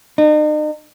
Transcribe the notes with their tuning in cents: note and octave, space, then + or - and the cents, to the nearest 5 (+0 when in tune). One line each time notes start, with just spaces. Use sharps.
D#4 -40